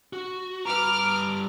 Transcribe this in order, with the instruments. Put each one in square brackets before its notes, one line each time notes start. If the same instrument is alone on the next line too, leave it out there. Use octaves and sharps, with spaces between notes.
[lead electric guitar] F#4
[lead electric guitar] G2 A#5 [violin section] B4 D6 F6